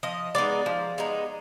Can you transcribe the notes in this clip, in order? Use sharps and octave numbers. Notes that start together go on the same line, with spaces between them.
F3 D#5
G#3 B3 D#4 D5
F3
G#3 B3 D#4